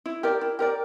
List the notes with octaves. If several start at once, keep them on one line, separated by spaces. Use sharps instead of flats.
E4
G4 A#4 D5
E4
G4 A#4 D5